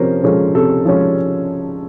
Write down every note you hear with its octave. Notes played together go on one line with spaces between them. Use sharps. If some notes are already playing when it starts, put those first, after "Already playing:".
Already playing: C3 F3 C#4 A#4 C5
F3 G#3 C#4 A4
C3 A4
F3 G#3 C#4 G#4